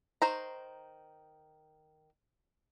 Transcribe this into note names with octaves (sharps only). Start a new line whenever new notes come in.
D#3 C5 A#5